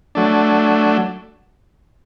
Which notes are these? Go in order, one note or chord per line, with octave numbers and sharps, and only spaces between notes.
F#3 A3 D4